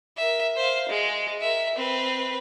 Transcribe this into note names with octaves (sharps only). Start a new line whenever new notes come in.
A#4 E5
C5 F5
G#3
A#4 E5
C4 B4